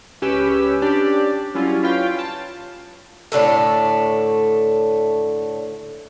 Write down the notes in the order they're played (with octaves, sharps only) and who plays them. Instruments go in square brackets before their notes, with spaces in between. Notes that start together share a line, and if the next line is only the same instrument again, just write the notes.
[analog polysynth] C#2 C#4 G4 B4 E6
C#4 D4 G4 D5
F#3 G3 C#4 E4 F4
C#4 F4 B4 F5 G5
A5
[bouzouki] A2 D3 A3 A4